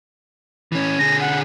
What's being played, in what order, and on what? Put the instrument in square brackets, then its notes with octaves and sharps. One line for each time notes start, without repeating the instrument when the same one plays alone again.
[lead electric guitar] E3 C#4
[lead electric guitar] D3 G#4 [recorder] A#6
[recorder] F#5